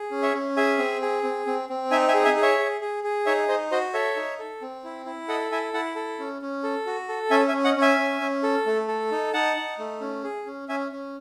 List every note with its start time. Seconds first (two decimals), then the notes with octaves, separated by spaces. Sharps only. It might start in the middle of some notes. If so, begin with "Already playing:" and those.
Already playing: G#4
0.11 C#4
0.22 C#5 E5
0.34 C#4
0.57 G#4 E5 G#5
0.78 C4
1.02 G#4
1.23 C4
1.47 C4
1.69 C4
1.91 D#4 E5 G#5
2.08 E5 G#5
2.14 G#4
2.25 E5 G#5
2.36 G#4
2.42 C#5 E5
2.59 G#4
2.81 G#4
3.04 G#4
3.26 D#4 C#5 E5
3.48 D#4 C5 D#5
3.71 F#4 C5 D#5
3.94 A4 C#5 E5
4.16 D#4
4.39 A4
4.62 C4
4.84 E4
5.06 E4
5.28 A4 D#5 F#5
5.52 E4 E5 G#5
5.74 E4 F#5 A5
5.96 A4
6.19 C#4
6.42 C#4
6.63 A4
6.86 F#4
7.09 A4
7.31 C#4 E5 G#5
7.48 E5 G#5
7.53 C#4
7.64 D#5 F#5
7.76 C#4
7.82 E5 G#5
7.99 C#4
8.21 C#4
8.43 A4
8.66 A3
8.88 A4
9.11 D#4
9.33 D#4 F#5 A5
9.57 D#4
9.79 A3
10.01 C#4
10.23 G#4
10.46 C#4
10.69 C#4 E5 G#5
10.92 C#4